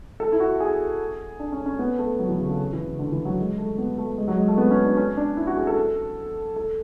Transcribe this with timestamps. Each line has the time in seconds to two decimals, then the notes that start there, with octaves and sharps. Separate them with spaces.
0.20 A4
0.32 E4
0.40 F#4
0.60 G#4
1.39 D4
1.52 C#4
1.66 C#4
1.79 B3
1.99 A3
2.19 F#3
2.29 E3
2.39 C#3
2.49 C#3
2.72 E3
2.85 C#3
2.99 D3
3.12 E3
3.25 F#3
3.38 G#3
3.58 A3
3.78 B3
3.98 A3
4.18 G#3
4.28 F#3
4.38 G#3
4.48 A3
4.58 B3
4.71 C#4
4.84 D4
4.97 C#4
5.17 D4
5.37 E4
5.47 F#4
5.57 G#4
5.67 A4
6.56 A4